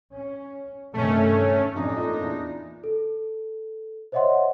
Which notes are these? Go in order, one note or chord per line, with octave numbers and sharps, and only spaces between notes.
C#4
G2 C3 D#3 A3 C#4
A1 F2 D4 D#4
A#2 A3 C#4 D#5
E2 E4
A4
C5 C#5 D#5 E5 F#5 C6